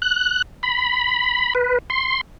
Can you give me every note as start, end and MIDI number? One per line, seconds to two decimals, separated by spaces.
0.02 0.42 90
0.63 1.53 83
1.55 1.78 71
1.90 2.21 84